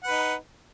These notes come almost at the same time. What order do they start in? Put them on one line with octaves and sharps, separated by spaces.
F#5 B4 D#4